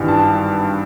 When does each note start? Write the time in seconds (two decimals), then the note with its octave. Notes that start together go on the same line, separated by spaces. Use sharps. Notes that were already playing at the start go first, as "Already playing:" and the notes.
Already playing: G#1 G2 E3 G3
0.08 A5